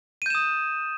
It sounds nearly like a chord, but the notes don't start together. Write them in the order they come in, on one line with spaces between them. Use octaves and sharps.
D#7 G6 E7 D#6